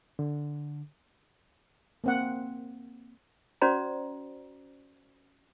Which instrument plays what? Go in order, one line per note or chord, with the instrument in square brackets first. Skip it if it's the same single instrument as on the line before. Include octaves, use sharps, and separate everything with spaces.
[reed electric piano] D3
[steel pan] A#3 C4 F#5
[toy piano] C#4 F#4 C5 D5 A#5